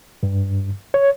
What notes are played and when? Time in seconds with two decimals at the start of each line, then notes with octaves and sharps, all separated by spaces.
0.23 G2
0.94 C#5